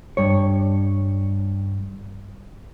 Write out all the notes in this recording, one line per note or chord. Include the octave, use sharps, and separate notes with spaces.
G2 C#5